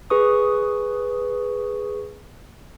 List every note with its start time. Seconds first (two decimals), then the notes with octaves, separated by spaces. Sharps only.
0.10 G#4 B4 C#6 D#6